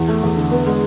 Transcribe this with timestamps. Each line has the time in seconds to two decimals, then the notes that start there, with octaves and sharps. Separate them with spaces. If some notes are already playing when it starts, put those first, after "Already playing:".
Already playing: E2
0.08 A3
0.23 E2
0.37 D3
0.51 B3
0.67 G#3